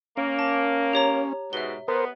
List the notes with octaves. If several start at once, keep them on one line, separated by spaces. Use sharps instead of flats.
A#3 C#4
A5
G4 C#5 A#5
G#2 B2 E5 G7
B3 A#4 C5